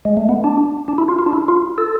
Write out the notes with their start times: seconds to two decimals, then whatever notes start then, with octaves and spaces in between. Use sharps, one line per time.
0.05 G#3
0.17 A3
0.29 B3
0.44 D4
0.88 D4
0.98 E4
1.08 F4
1.19 F4
1.26 D4
1.33 E4
1.48 F4
1.78 A4